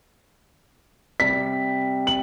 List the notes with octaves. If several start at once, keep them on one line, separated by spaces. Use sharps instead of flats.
C3 G3 B6
F#7